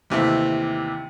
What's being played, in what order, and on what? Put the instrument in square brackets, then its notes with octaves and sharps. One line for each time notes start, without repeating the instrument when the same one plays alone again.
[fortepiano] D#2 C3 E3 A3